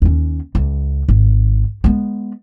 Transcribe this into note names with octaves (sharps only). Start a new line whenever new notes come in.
D#2 C#4
C#2
G#1
G#3 B3